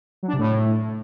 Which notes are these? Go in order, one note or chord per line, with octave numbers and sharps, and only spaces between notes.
F#3
D4
C3
A2